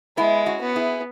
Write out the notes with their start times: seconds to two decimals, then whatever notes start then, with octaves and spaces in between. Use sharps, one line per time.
0.17 G#3 B3 E4
0.46 C#4 F#4
0.61 B3
0.76 E4 G#4